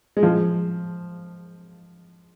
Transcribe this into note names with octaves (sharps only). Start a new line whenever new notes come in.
G#3
F3